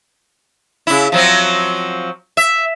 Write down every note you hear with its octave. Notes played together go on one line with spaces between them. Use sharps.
C#3 E4
F3 F#3 C4
E5